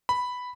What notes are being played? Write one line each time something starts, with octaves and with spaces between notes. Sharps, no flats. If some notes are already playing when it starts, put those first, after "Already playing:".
B5